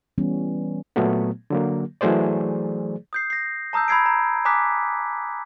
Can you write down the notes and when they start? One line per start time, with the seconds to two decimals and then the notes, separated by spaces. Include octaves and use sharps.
0.18 E3 G3 B3 C#4
0.96 A#2 F#3 A3 B3
1.50 D3 F#3 A#3
2.01 E3 F#3 A3 G#4 C5 D5
3.13 D#6 G6 C7
3.30 A#6 C7
3.73 A5 A#5 D#6 E6 G6
3.88 B5 E6 G#6 C7 D7
4.06 A#5
4.45 G#5 A#5 D6 D#6 F#6 B6